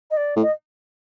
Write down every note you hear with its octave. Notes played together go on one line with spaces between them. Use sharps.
D#5
D5
A2
D#5